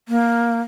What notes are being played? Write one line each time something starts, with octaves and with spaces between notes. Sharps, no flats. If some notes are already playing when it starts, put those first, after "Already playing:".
A#3